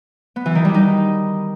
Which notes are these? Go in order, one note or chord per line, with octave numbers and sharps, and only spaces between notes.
B3
E3
D#3
G3
D#4